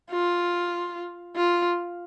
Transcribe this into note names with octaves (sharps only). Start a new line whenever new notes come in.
F4
F4